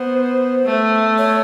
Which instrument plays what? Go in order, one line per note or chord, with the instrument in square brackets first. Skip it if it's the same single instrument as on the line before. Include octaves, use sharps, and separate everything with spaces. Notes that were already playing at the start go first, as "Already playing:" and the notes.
Already playing: [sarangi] B3 [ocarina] C5
[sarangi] A3
[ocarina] C#5